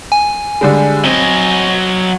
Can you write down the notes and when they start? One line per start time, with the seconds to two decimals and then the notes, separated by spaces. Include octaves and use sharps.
0.12 G#5
0.61 D3 G3 G#3
1.04 F#3 C4 D#5